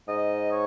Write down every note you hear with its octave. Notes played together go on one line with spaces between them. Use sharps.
G#2 D#5
C#5